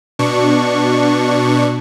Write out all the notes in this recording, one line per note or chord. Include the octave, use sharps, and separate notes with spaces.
B2 D4 C#6